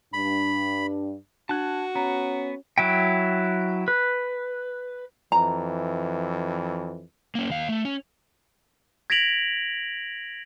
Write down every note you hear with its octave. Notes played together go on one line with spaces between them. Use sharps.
G2 D4 B5
D4 F#4 A5 F#6 G#6
B3 C#4 A#5
F#3 E4 G5
B4
F2 E3 A#5
A#3 C#4
D#2 F5
A3
C#4
G#6 A#6 B6 D7 F7 F#7